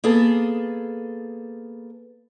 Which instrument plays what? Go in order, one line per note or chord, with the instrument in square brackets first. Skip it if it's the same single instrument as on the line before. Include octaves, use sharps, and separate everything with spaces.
[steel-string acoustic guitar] A#3 B3 G#4 A4